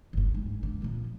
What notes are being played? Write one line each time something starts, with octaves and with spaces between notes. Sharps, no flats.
G1 G#2
G#2
D3
A#1 F3